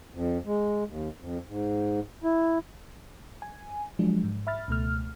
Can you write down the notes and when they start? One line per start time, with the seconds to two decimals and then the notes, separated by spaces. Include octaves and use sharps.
0.14 F2
0.45 G#3
0.87 D#2
1.20 F2
1.48 G#2
2.24 E4
3.42 G#5
3.99 F3 F#3 G#3 D4
4.24 G#2
4.47 E5 B5 F6 A6
4.68 C#2 B2 A3 F6